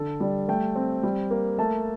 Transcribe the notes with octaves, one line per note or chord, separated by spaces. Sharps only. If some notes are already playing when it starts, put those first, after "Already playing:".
Already playing: D3 A4
G3 D5
A3 G5
C4
G3
A#3
A3 A5